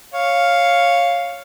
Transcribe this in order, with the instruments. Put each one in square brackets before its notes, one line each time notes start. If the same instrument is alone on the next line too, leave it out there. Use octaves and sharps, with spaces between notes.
[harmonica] C#5 F5